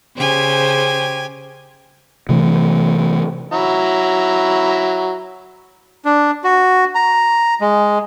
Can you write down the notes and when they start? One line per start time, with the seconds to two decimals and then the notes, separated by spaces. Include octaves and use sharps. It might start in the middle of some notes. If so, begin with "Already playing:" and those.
0.17 C#3 G4 C5 G#5
2.29 C3 E3 A3
3.52 F#3 E4 A#5
6.05 D4
6.44 F#4
6.95 A#5
7.61 G#3